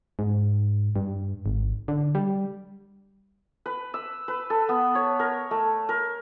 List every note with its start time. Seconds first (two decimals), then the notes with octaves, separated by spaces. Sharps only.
0.19 G#2
0.96 G2
1.46 G#1
1.88 D3
2.15 G3
3.66 B4
3.94 E6
4.28 B4
4.50 A4
4.69 B3
4.95 C#5
5.20 A#4
5.51 A3
5.89 A#4